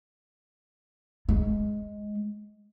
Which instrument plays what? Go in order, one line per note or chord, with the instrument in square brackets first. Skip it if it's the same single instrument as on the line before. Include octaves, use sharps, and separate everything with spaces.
[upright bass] G#3